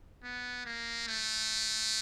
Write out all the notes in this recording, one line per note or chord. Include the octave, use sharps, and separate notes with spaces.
B3
A#3
A3